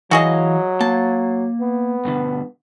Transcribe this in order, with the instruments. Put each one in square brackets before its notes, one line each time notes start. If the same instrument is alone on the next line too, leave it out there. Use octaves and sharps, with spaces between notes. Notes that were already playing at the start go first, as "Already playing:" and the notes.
[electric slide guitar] E3 E4 F5 [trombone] F#3 [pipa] F#4 G#4 D#5
[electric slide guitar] A#3 [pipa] A5
[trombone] B3
[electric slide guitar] G2 B2 D3